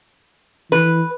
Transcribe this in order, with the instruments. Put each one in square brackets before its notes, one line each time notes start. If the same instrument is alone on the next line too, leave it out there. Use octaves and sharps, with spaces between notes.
[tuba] E3 [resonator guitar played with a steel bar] B4